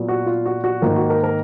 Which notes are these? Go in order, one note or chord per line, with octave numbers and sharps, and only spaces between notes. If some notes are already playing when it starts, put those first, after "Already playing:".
Already playing: A#2 F#3 B3
F#4
F4
F#4
F#4
G#2 D#3 A#3 F4
F#4
A#4
A#4